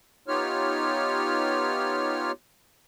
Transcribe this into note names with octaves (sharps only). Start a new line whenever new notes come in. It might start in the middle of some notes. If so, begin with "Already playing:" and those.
B3 D#4 F4 G4 C#5 F6